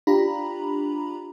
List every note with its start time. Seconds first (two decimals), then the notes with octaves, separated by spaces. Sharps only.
0.07 D4 F4 G4 A#5 B5